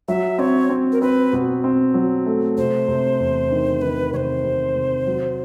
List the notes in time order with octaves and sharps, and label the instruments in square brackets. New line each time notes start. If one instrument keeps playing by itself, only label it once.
[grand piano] F#3 [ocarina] E5
[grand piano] C4 [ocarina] C#5
[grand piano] C4
[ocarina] A#4
[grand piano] C4 [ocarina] B4
[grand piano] B2
C4
F#3
A3
[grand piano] C3 [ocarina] C5
[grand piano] C3
E2
D#3
[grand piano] D#3 [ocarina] B4
[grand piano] C3 [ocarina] C#5
[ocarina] C5
[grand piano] C3
C3
F#3